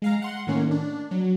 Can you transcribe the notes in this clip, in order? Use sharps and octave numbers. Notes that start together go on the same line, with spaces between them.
G#3 F5 A#5
F#5 C6
A2 D#3 A#3 C#4
D4
F#3